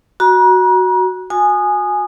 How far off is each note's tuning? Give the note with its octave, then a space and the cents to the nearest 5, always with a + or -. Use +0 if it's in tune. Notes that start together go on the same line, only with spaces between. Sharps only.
F#4 +0 A#5 +40
F#4 -25 G#5 +0 D#6 -20